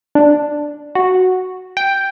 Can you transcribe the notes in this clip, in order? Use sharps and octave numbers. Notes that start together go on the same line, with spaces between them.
D4
F#4
G5